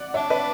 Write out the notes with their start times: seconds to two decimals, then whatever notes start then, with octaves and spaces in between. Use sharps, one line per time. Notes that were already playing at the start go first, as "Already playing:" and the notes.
Already playing: D5 F#5
0.14 D4 C#5 E5
0.30 B4 D5